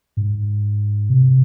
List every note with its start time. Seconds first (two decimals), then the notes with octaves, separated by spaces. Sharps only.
0.17 G#2
1.10 C3